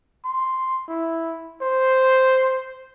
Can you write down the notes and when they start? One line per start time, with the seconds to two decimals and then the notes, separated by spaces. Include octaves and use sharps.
0.25 C6
0.88 E4
1.62 C5